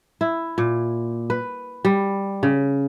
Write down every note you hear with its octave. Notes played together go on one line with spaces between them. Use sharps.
E4
A#2
B4
G3
C#3